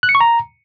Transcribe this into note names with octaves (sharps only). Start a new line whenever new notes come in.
F#6
C#7
C#6
A#5